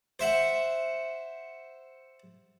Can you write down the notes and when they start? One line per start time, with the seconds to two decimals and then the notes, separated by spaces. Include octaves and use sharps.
0.19 C5 E5 F#5